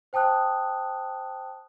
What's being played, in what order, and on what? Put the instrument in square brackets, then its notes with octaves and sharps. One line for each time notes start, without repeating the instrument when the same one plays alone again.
[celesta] C5 G5 A5 D#6 F#6